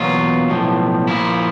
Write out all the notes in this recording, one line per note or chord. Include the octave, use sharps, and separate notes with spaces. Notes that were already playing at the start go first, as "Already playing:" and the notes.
Already playing: E2 B2 F#3 A#3 F4
B1 A2 F3
A#2 F3 A#3 E4